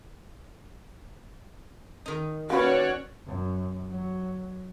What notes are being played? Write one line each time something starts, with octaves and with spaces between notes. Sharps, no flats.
D#3 D#4
A#3 C#4 F#4 B4 C#5 D5
F#2
F#3